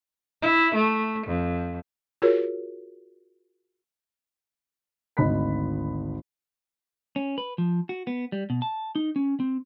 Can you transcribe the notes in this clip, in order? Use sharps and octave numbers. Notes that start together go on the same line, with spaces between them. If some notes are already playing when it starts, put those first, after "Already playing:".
E4
A3
F2
F4 F#4 G#4 A#4 C#5
G#1 D2 D#5 B5 F#6 B6
C#4
B4
F3
F#4
B3
G3
B2
A5
D#4
C#4
C4